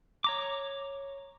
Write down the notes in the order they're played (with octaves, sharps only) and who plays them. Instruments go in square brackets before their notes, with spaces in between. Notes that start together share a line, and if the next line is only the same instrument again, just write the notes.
[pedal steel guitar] C#5 A#5 D6